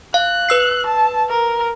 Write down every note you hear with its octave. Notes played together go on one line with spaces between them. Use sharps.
F5 F#6
B4 E6 C7
A5
A#4